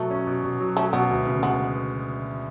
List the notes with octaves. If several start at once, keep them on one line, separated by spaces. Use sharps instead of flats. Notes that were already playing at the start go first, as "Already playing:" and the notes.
Already playing: B2 F#3 A3
C#4
B2
B2
F#3
A3 C#4
B2 B3
D2
C#3
G#3 B3